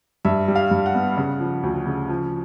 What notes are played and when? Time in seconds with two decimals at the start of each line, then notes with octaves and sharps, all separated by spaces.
0.25 G2 E5
0.48 G3
0.55 F5
0.71 G2
0.86 F#5
0.94 B3
1.17 C#3
1.40 F3
1.63 D2
1.87 C#3
2.09 F3